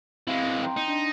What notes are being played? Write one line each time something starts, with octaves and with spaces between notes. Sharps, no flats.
E3 G#3 C4 F5
G5 A#5 C6
D#4
D4